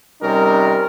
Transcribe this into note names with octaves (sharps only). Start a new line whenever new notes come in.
C3 G3 C#4 D#4 A#4